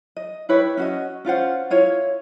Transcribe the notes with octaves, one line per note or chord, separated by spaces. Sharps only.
D#5
E4 G4 B4 C#5
C#4 F#4 D#5
C#4 F4 C5 F#5
E4 F4 C#5